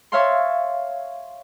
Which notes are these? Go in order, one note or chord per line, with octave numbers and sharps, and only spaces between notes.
C#5 E5 F5 A5 C6